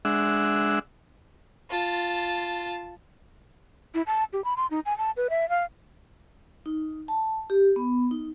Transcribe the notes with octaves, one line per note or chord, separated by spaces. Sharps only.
G#3 D4 E5 F#5 E6
F4 A5
E4
A5
G4
B5
C6
D#4
G#5
A5
B4
E5
F5
D#4
A5
G4
B3
D#4